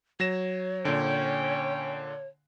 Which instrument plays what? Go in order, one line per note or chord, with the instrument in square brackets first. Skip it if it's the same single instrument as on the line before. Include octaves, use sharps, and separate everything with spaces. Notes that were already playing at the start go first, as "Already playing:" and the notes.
[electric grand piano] F#3 A#6 E7 [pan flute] C#5
[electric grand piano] A#2 D3 [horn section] C#4 G5